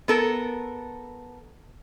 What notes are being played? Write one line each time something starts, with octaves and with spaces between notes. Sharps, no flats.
B3 A4 A#4